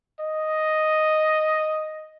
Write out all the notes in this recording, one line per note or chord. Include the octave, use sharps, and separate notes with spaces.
D#5